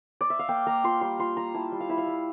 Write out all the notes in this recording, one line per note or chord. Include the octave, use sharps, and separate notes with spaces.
D5
E5
F5
A#3 G5
A#3 A#5
F4 C6
G3 C6
F4 C6
F4 A#5
E4 A5
G3
F5
E4 E5
F5
G3